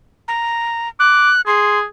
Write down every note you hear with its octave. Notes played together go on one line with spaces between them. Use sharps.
A#5
D6 F#6
G#4 C6